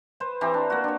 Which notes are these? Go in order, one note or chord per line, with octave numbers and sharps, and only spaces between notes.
B4 C5
E3 C4 G4 A#5
D4
A#3 F#4
D4 C#5